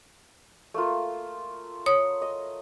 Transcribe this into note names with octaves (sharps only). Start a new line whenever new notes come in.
A3 A#3 F4
C#5 D#6
D#5